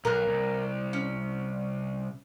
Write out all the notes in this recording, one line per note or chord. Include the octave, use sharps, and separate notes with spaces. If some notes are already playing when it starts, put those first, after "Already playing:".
B1 A#4 F#6
C2
C#4